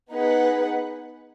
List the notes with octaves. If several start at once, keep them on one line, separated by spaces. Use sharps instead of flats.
B3 D#4 G#4 B4 F#5